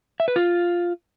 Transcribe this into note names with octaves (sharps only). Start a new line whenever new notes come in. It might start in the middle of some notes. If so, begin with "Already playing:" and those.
E5
B4
F4